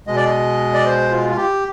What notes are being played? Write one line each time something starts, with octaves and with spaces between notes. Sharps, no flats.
B2 G#3 D#5
D5
D#5
D5
C5
F4
F4
G4